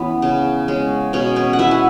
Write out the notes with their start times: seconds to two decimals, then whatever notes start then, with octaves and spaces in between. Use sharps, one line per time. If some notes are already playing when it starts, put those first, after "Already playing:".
Already playing: E3 B3 C#4
0.22 C#3
0.68 G#3 C#4
1.13 B2 C#4 C#5
1.36 C#4 C#5
1.53 F#5
1.59 B3 E4 E5
1.71 G#5